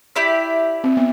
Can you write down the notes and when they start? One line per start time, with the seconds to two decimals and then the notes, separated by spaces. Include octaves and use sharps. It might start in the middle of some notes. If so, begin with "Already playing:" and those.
0.16 E4 G4 D5
0.84 C4
0.97 B3